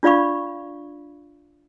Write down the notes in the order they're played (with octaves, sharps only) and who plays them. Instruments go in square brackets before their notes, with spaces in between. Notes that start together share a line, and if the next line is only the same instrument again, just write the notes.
[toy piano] D4 F4 D5 F5 B5 C#6